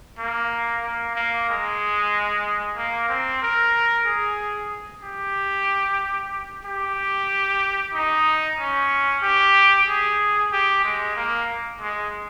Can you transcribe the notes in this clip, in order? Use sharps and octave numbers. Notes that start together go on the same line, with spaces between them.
A#3
A#3
A#3
G#3
A#3
C4
A#4
G#4
G4
G4
D#4
C#4
G4
G#4
G4
G#3
A#3
G#3